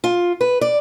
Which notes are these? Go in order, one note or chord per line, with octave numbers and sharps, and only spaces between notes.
F4
B4
D5